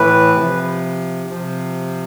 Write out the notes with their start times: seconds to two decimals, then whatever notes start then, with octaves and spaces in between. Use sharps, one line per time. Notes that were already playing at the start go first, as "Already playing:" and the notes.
Already playing: A2 E3 B4
0.34 C3 F3
1.30 C3 F3